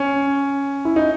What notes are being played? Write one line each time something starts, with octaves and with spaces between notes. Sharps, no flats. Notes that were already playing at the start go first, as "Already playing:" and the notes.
Already playing: C#4
E4
D#4